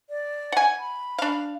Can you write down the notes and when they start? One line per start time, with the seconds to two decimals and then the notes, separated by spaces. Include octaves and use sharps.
0.10 D5
0.52 F#5 G#5
0.79 B5
1.18 D4 F5